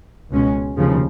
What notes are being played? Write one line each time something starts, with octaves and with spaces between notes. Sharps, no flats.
C#2 B2 G#3 C#4
F1 D#2 C#3 F3